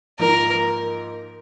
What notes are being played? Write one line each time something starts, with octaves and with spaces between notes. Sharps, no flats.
G#2 F3 A#3 D#4 A#4